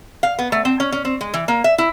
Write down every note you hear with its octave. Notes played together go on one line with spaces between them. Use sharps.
F5
B3
A3
C4
C#4
C#4
C4
G#3
E3
A#3
E5
E4